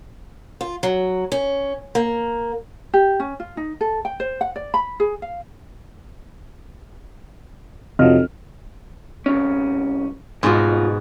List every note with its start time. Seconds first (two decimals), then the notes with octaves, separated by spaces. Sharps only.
0.61 F4
0.83 F#3
1.32 C#4
1.95 A#3
2.94 G4
3.20 C#4
3.40 F4
3.57 D#4
3.81 A4
4.05 G5
4.20 C5
4.41 F#5
4.56 D5
4.74 B5
5.00 G#4
5.22 F5
7.99 F1 C3 F3 F#3 D#5 F6
9.26 C2 G#2 C#4
10.43 C2 G#2 B2 F4 F#4